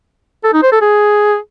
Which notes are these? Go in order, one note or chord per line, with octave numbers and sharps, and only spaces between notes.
A4
D#4
C5
A4
G#4